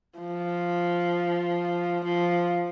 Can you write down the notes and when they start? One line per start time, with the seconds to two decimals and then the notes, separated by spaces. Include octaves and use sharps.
0.19 F3
2.05 F3